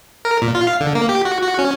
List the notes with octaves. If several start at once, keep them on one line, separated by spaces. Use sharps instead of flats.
A#4
A#2
F4
F5
D3
A#3
G4
F#4
F#4
C#4